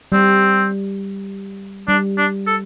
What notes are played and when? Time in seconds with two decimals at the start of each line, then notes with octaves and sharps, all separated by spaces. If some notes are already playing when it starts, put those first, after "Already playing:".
0.12 G3 C4
1.88 G3 D4
2.17 D4
2.47 A4